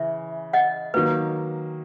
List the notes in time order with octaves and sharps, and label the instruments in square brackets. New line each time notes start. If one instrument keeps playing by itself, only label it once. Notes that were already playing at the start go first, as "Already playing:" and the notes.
Already playing: [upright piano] C#3 E3 [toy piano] E5
[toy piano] D#5 F#5
[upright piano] D#3 F#3 A#3 [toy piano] B4